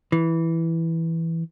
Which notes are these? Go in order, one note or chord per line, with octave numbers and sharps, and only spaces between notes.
E3